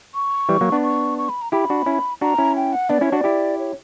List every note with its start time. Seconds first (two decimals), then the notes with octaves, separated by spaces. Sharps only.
0.15 C#6
0.49 E3 G3
0.61 F#3 A#3
0.72 B3 D4
0.84 C#6
1.18 C#6
1.29 B5
1.42 A#5
1.52 E4 G4 B5
1.70 D4 F#4
1.86 C#4 E4
2.21 D4 F#4 A#5
2.38 C#4 E4
2.56 G5
2.73 F#5
2.89 B3 D4 D5
3.01 C#4 E4 C#5
3.12 D4 F#4
3.17 D5
3.24 E4 G4
3.59 C#5